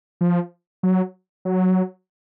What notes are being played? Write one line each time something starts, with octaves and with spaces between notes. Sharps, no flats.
F3
F#3
F#3